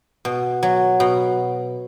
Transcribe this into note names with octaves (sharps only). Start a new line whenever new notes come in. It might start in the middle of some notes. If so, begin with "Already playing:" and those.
B2
F#3
B2